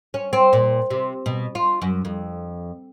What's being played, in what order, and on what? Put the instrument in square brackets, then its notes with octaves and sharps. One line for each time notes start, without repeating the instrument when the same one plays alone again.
[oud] C#4
C4
A#2
C3
B2
F4
F#2
F2